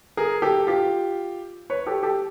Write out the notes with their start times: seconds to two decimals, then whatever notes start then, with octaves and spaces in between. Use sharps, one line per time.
0.17 G#4 A#4
0.42 G4 A4
0.67 F4 G4
1.70 B4 C#5
1.86 G4 A4
2.03 G4 A4